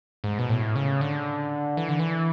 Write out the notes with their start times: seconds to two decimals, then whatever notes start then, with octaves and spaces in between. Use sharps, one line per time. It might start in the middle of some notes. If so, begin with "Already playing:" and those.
0.24 G#2
0.39 B2
0.49 A2
0.75 C#3
1.01 D3
1.77 E3
1.89 D3
1.99 E3